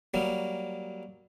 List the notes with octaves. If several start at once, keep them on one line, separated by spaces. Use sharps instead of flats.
F#3 G3 A#3